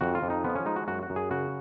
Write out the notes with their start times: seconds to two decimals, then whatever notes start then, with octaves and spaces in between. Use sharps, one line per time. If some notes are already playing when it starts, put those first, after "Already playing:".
0.01 F2 F#4
0.15 F4
0.22 F2
0.30 D#4
0.44 F3 B3
0.55 C#4
0.65 G#3 D#4
0.76 F#4
0.88 F#2 F#4
1.03 F#4
1.10 F#2
1.16 G#4
1.31 C#3 F#4